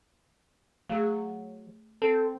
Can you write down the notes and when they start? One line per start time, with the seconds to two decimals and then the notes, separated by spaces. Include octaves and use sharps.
0.89 F#3 A3 G#4
2.02 C4 A4